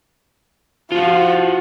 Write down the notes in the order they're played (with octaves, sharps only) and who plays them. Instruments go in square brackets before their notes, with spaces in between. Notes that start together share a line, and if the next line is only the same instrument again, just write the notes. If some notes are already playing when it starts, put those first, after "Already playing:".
[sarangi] F3 [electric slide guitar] F4 F#4